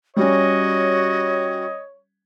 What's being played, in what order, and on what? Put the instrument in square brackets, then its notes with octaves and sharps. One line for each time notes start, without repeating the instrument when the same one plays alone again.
[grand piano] G3 C#4 [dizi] F#4 [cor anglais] C#5 [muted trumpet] D#5